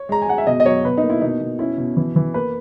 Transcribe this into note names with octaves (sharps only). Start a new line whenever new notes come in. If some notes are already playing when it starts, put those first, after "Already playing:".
Already playing: C#5
G#3 A#5
G#5
G#3 F#5
E5
B2 D#5
D#5
F#3 C#5
B2 B4
D#4
A#3
E4
B2 D#4
B2
C#4 E4
B2
E3
E3
A#3 B4